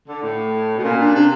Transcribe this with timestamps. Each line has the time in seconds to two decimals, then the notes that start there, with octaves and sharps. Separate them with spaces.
0.08 D3
0.22 A2
0.77 B2
0.84 A#2 C#4
1.00 D4
1.14 C3 D4